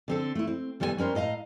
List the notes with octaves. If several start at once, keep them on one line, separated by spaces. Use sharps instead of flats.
D3 C4 A4
A3 E4
C4
D#2 G3 B3 F#4 A4 G#5
G3 C#4 A#4 C5
A2 D#5 F5 A#5